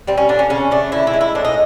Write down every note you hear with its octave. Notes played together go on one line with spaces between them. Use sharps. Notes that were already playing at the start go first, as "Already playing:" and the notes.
G3 C4
C#4
D3 D4
C#4
C#3 C#4
A3 D4
D3 E4
E4
G#3
E4
A2 D4
D#4